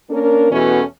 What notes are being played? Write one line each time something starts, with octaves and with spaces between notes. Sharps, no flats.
A#3 C#4 D4 A#4
E2 B2 E3 A3 C#4 F#4